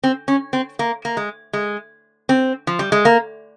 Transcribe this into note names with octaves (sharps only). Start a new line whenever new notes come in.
C4
C#4
C4
A#3
A#3
G#3
G#3
C4
F3
G3
G#3
A#3